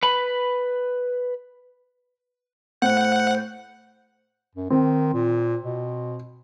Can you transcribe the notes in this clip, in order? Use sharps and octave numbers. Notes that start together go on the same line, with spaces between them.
B4 B5
A2 C5 F#5
F#2
D#3 C4
A#2
B2